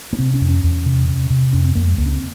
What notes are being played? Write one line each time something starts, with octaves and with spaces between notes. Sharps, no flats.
A#3
C3 C4
C#4
F2
C#4
E2
C3
C3
C3
F2 C#4
C4
F2 A#3
G#3
C#2 A#3
C#4
C4